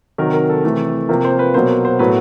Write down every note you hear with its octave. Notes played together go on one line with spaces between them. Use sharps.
C3 D#3 F#3 A#4
A#4
A4
C3 E3 A3 A4
C3 F3 A#3 A#4
C5
B4
B2 F#3 A#3 C5
C5
A2 F#3 B3 B4